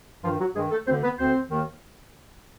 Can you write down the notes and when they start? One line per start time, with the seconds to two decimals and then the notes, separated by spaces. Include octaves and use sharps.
0.24 G2 D#3 F3 F4
0.39 F#3 F#4
0.55 G2 D#3 G#3 G#4
0.71 A3 A4
0.86 D2 C4 C5
0.91 D3
1.03 B3 B4
1.19 D2 D3 C4 C5
1.50 D#2 D#3